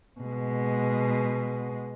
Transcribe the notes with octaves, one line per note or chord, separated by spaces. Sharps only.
B2 G#3